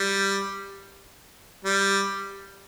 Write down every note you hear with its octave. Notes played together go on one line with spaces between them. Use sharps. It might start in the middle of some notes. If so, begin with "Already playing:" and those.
Already playing: G3
G3